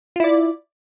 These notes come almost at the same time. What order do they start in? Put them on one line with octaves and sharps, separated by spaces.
F4 E4 D5